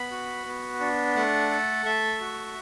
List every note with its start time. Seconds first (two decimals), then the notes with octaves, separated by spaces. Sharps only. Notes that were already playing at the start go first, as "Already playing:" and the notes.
Already playing: B3 B5
0.11 F#4
0.46 B3
0.80 D4
1.15 A3 F#5
1.50 A4
1.85 A3 E5
2.21 F#4